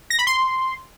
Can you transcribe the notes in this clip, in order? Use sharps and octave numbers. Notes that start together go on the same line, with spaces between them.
A#6
B5
C6